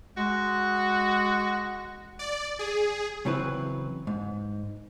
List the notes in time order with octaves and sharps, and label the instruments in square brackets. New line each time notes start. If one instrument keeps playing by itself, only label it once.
[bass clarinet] G#3 [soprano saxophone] F#4
[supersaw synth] D5
G#4
[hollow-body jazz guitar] C#3 E3 F#3 C4 E4 B4
G#2